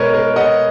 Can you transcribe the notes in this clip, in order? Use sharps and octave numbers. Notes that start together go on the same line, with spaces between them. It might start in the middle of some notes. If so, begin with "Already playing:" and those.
Already playing: B2 G#3 A#4 B4 C#5 D#5
A#4
D#5 F#5